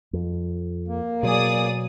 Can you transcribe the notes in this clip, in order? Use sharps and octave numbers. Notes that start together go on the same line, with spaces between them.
F2
A#3
B2 F#3 G#4 D5 D#6